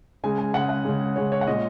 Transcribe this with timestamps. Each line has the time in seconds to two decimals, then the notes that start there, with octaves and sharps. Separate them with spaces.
0.24 C#3 G#3 G#5
0.38 G#5
0.54 C#3 G#3 F#5
0.69 F#5
0.85 C#3 G#3
1.16 C#3 G#3 C#5
1.32 C#5
1.41 F#5
1.47 A#2 G#3 D#5